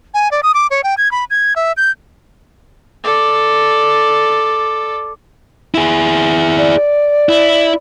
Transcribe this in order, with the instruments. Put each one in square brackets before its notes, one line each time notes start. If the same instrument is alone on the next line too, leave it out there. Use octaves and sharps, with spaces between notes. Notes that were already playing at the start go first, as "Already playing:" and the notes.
[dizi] G#5
D5
D#6
D6
C#5
G5
G#6
B5
G#6
E5
G6
[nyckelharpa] A4 D5
[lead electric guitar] E4 G#4
[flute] D5
[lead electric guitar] E4